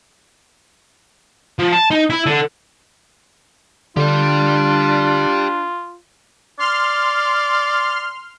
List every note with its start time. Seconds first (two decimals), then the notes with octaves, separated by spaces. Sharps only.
1.59 F3
1.73 A5
1.91 D#4
2.10 E4
2.26 D3
3.97 D3 D4 F4 G4 D5
6.59 D5 C6 F6